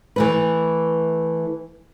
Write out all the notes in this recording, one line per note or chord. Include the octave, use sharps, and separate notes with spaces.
E3 A3 B4